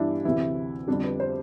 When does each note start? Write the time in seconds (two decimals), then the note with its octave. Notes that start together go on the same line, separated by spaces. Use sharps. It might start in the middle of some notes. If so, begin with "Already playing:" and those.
Already playing: G2 E3 G3 D4 E4
0.25 D2 C3 E3 E4
0.88 F2 D3 G3 D4
1.04 B4
1.20 C5